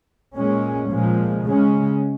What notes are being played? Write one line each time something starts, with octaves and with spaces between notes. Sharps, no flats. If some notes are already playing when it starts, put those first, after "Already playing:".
A#2 G#3 C#4
A#2 F3 G#3
C#3 G#3 C#4